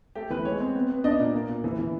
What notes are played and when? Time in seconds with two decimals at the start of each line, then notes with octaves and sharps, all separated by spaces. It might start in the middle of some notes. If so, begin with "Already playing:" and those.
0.15 A3 G4
0.30 E3 B4
0.45 G#3 C#5
0.60 C4
0.75 B3
0.90 B3
1.04 D4 D#5
1.19 A#2
1.34 A#3
1.48 A#2
1.64 E3
1.79 E3